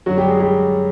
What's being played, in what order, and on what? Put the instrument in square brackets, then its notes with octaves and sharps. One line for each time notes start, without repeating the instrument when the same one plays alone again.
[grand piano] F#2 D3 F#3 F#4
G3 G4
G#3 G#4
G3 G4